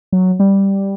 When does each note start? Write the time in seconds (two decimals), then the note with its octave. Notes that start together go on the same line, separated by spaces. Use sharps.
0.12 F#3
0.40 G3